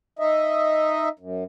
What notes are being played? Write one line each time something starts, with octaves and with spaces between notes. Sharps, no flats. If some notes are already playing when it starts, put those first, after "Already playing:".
D#4 D#5 E5
F#2